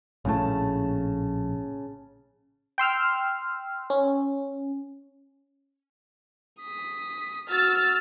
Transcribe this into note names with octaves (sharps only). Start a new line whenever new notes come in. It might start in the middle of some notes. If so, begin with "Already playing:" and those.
A#1 A2 C#3 A3 A5
G5 C6 E6 F6
C#4
D#6 B6
F#4 E6 F6 A6